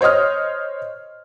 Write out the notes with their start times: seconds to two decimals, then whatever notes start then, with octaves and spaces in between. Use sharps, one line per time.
0.01 C5 C#5 D#5 D#6 F6